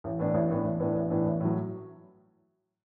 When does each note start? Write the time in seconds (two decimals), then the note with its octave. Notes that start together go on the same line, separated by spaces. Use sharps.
0.04 A1
0.19 A2 E3 B3 D4
0.34 A1
0.50 A2 E3 B3 D4
0.65 A1
0.80 A2 E3 B3 D4
0.95 A1
1.10 A2 E3 B3 D4
1.26 A1
1.40 A2 F#3